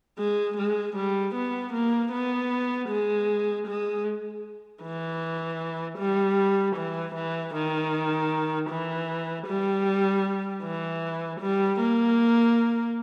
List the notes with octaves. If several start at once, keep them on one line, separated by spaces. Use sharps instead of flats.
G#3
G#3
G3
B3
A#3
B3
G#3
G#3
E3
G3
E3
E3
D#3
E3
G3
E3
G3
A#3